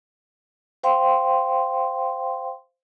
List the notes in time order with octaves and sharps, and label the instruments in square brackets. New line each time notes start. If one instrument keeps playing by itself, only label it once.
[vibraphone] C5 F5 G5 C6